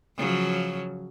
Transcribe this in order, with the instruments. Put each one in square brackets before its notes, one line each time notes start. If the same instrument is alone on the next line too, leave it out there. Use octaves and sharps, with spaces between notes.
[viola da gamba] C#3 F3 F#3